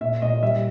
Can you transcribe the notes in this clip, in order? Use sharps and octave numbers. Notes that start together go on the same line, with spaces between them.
A#2 E5
A#2 D#5
G3 E5